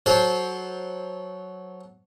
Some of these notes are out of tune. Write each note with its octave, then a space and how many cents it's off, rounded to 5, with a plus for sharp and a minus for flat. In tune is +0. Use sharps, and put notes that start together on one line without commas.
F#3 +0 A4 -25 C5 +5